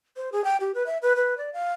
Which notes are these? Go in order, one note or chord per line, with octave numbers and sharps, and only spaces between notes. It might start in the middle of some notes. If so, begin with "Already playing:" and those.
C5
G#4
G5
G4
B4
E5
B4
B4
D5
F5